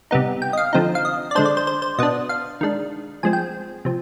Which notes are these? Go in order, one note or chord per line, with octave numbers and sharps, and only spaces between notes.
C3 G3 B3 D#4
G5
D#5
F5
D3 F3 C4 D#4
F5
D#5
D5
D3 G#3 D4 C5
D5
C5
C5
C5
B2 B3 D4 D#5
F5
D#3 G#3 D4
F3 G#3 C4 G#5
G5
C3 F3